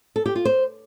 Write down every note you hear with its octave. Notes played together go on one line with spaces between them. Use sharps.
A4
G4
F4
C5